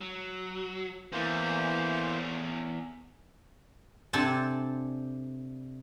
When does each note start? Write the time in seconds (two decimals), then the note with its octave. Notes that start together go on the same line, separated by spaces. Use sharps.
0.01 F#3
1.12 E2 E3 A3 A#3 C#4 C5
4.13 C3 C4 D4 A4 G#5 A5